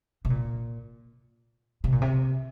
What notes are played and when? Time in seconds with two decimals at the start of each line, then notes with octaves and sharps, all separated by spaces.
0.25 C3
0.30 A#2
1.84 C3
1.92 A#2
2.02 C3